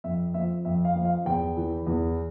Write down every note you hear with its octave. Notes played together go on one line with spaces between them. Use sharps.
F2 E5
F3 E5
F2 E5
F5
F3
F5
E2 G5
E3
E2